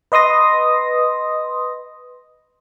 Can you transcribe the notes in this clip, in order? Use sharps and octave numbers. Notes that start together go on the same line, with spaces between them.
B4 D#5 C6 D#6 A#6